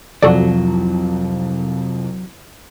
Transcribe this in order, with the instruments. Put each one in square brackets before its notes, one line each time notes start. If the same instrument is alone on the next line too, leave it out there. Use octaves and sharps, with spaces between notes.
[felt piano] C2 F2 F3 [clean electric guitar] F#3 [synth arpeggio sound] F#4 A4 D5